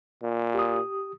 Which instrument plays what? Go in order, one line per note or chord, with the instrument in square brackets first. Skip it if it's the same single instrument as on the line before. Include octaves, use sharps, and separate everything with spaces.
[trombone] A#2
[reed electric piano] G4 D#6